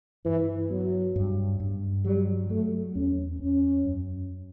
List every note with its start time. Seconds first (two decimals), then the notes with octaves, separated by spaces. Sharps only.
0.25 G2 E3
0.70 F#3 B3
1.16 G2
1.60 G2
2.05 F#3 G3
2.49 F#3 A3
2.95 E2 C#4
3.40 E2 C#4
3.84 F#2